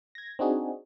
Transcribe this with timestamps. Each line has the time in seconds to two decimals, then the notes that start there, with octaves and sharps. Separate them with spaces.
0.15 G#6 A#6
0.39 C4 D4 D#4 F#4 G#4